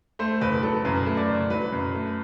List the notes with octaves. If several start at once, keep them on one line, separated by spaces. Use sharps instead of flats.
A3 C5
F#1 B4
F#3 A4
F#2 B4
A3
D5
F#1
F#3 B4
F#2
A3